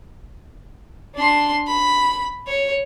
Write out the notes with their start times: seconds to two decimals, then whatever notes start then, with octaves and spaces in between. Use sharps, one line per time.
1.15 D4 C6
1.67 B5
2.47 C#5